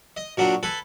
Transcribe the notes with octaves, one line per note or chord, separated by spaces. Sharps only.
D#5
A#2 F#3 D4 F#4
A4 B4 G#5